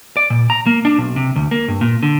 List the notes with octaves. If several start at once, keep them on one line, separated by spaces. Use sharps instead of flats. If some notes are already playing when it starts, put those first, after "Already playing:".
D5
A#2
A#5
A#3
D4
B1
C3
D2
A#3
G2
A#2
D3